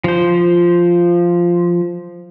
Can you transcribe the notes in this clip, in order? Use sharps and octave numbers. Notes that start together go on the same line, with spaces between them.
F3 C5